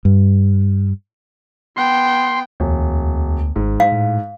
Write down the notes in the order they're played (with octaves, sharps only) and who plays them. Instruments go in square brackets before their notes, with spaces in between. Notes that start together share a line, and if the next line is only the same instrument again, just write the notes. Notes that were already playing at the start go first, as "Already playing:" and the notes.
[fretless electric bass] G2
[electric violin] B3 G5 [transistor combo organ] C6
[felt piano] E1 [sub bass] D2
[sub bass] G#1 [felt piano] G#2
[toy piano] F5
[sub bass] A2